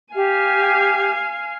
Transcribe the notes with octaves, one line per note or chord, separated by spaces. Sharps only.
G4 F5 G#5